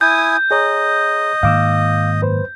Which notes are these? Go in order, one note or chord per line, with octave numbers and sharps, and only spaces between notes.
E4 G#5 D#6 G6
G#4 C#5 D#5 A#5
G#2 D#3 A#3 F5 D6 E6
F#2 B4 C5